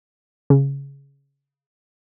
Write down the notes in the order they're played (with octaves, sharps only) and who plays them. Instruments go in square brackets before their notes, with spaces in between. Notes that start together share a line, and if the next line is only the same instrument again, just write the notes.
[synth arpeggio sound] C#3